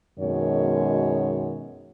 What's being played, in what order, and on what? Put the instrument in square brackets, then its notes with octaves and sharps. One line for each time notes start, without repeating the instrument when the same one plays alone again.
[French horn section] F#2 B2 D#3 G#3 C#5